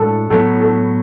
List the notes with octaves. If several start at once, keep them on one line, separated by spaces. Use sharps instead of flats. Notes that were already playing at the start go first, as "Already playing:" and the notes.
Already playing: A2 G#3 D4 F#4 A4
A2 F#3 B3 A4
A4